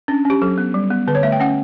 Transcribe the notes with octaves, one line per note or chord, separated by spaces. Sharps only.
C#4 D4
C#4 G4
F#3 A4
B3
G3
B3
D3 B4
C#5
A3 E5
G5
C#4 F#5